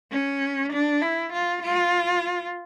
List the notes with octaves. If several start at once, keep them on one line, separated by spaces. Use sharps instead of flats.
C#4
D4
E4
F4
F4